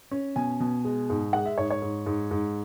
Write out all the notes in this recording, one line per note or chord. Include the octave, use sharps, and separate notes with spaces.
C#4
B2 G#5
B2
G#3
G#2
G#3 F#5
E5
G#2 C#5
C#5
G#2
G#2
G#2